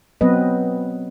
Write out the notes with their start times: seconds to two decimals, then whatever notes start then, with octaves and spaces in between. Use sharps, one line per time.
0.21 F#3 B3 C4 B4 D#5